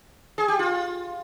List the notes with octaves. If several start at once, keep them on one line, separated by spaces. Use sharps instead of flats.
G#4
G4
F4